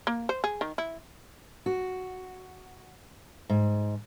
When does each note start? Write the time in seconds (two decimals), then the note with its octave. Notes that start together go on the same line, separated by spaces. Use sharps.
0.07 A#3
0.29 C5
0.44 G#4
0.61 D#3
0.78 E4
1.66 F#4
3.50 G#2